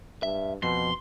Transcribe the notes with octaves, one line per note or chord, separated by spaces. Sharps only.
G2 E5
F2 B2 C6